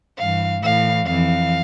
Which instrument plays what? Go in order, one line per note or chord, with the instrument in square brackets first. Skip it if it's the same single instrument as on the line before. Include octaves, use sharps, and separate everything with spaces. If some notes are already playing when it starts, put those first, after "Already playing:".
[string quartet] G2 E3 F5
A2 E3 F5
F2 E3 F5